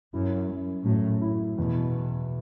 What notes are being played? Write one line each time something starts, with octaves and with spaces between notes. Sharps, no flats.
F#2 E4
F#2
A2 F#3
E4
E2 B2